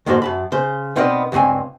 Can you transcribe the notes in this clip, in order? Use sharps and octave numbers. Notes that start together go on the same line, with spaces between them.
F2 G#2 D3 A#3 F#4 C5
F#2 A5 B5
C#3 C5
B2 B3 C4 D#4 A#4 D5
C#2 G2 F#3 C4 G#5